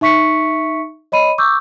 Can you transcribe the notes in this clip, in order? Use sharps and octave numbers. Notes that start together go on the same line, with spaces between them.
D#4 E5 C#6 B6 C#7
C#5 D#5 B5 D#7
C#6 D6 E6 G6